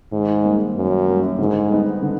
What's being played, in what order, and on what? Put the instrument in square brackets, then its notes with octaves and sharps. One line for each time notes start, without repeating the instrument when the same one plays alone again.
[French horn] G#2 [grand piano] D#3
[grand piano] G3 A#3
[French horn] F#2 [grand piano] D#3
[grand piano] G3 A#3
[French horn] G#2 [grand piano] D3
[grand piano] G3 B3 D#4
D3